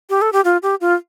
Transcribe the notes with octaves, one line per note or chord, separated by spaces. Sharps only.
G4
A4
G4
F4
G4
F4